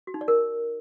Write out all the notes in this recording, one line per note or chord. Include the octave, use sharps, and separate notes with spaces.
F#4
D#4
D5
A#4